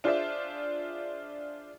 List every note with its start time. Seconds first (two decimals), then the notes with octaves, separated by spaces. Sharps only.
0.04 D4 F4 G#4 C5 D5 E5